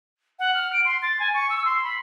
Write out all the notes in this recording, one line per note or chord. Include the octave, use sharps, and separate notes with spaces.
F#5
F6
D7
C6
A6
G#5
C#6
E6
C6
B5